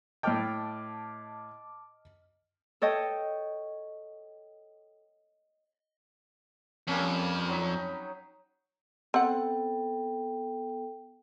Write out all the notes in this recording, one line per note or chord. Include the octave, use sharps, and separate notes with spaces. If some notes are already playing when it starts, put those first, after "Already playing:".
A2 D#5 G5 A5 D6 F6
A4 C#5 D#5 G5
F2 G3 A#3 C#4
F#3 D#4 B5
B3 C4 A4 F#5 G5